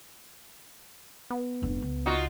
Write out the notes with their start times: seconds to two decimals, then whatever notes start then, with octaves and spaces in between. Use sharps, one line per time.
1.30 B3
1.62 F1 G2
1.82 C#2
2.06 D#4 F4 F#4